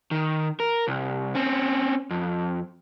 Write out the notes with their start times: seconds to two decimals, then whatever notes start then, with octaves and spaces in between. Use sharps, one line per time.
0.11 D#3
0.60 A#4
0.88 C2
1.35 C4 C#4
2.10 F2